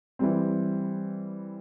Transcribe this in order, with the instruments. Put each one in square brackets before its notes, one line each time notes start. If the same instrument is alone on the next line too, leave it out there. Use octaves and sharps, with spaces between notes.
[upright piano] E3 G3 C4